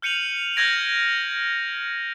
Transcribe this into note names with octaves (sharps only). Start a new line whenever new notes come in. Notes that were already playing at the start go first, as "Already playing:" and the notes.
F6 G6 C#7 D#7 F7 F#7
F6 G6 G#6 A#6 D7